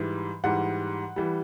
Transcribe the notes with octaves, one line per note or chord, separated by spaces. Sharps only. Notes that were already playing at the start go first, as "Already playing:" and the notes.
Already playing: G#2 E3 G3
G#2 E3 G3 F#5
E3 G3